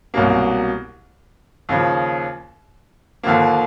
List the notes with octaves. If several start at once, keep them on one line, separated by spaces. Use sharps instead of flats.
C2 B2 F#3 A#3
D#2 C#3 F3
D#2 D3 F3 A#3